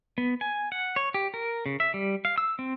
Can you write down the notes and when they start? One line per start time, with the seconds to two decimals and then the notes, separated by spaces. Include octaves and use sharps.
0.18 B3
0.41 G#5
0.72 F#5
0.96 C#5
1.14 G4
1.34 A#4
1.66 C#3
1.80 E5
1.94 G3
2.25 F5
2.38 E6
2.59 C4